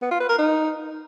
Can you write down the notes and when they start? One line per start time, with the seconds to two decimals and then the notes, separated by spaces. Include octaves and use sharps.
0.02 B3
0.11 F4
0.20 B4
0.29 A#4
0.38 D#4